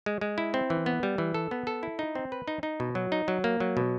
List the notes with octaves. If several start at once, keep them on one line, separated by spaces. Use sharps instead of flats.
G#3
G#3
E4
C4
E3
B3
G3
E3
A4
B3
A4
E4
D#4
C4
B4
D#4
D#4
B2
F#3
D#4
F#3
A#3
F#3
B2